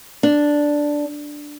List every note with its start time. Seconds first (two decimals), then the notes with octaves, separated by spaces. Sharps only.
0.23 D4